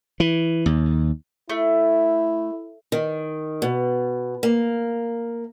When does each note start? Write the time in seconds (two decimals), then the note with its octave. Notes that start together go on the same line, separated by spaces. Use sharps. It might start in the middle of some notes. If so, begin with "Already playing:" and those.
0.20 E3
0.66 D#2
1.50 A3 E4
2.92 D#3
3.62 B2
4.43 A#3